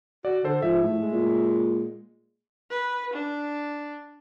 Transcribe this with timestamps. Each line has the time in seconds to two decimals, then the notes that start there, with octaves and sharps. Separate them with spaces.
0.25 F#4 D5
0.44 D3 A4 C5
0.62 G#2 F3 E5
0.83 A2
0.99 G#3
1.12 A#2
2.71 B4
3.13 D4